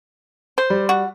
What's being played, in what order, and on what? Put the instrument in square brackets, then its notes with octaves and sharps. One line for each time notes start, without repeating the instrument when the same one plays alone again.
[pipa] C5
[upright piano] G3
[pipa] F#4